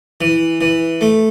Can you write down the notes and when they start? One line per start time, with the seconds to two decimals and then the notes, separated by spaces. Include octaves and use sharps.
0.21 E3
0.61 E3
1.01 A3